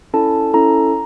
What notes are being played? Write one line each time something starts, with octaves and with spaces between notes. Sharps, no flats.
C#4 E4 A4 A5
C#4 E4 A4 A#5